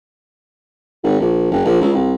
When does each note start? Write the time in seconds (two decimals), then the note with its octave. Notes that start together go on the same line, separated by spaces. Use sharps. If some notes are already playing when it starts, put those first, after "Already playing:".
1.04 G#1
1.20 A#1
1.51 F#1
1.65 A#1
1.81 C#2
1.93 C2